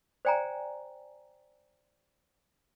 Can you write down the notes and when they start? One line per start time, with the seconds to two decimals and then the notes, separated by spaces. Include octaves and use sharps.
0.25 C5 D5 G5 G#5 A#5